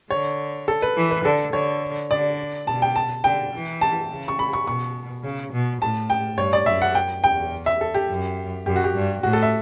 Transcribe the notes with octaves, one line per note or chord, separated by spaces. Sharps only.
D3 C#5
A4
B4
E3
B4
D3 A4
D3 C#5
D3 D5
B2 A5
G5
A5
D3 G5
E3
A5
C#3
C#6
B5
C#6
B2 C#6
C#3
B2
A2 A5
G5
G2 C#5
D5
F#2 E5
F#5
G5
E2 G5
E5
A4
G4
F#2
F#2 G4
F#4
G4
G2
A2 F#4
A4
E5